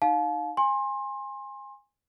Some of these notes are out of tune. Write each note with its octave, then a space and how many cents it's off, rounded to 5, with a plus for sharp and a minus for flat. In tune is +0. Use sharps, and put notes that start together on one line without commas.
D#4 +0 F5 +30 A5 -40
G#5 -20 C6 +25